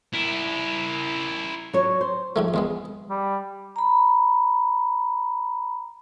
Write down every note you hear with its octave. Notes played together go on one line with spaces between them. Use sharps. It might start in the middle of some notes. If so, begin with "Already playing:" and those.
E4 A#4
F#3 C#5
C5
G#2 F3 A3
E2 G#3 B3
G3
A#5 B5